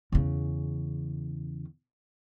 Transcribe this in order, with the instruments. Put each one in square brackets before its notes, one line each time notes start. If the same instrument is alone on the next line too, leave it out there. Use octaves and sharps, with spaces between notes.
[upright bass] E2 C#3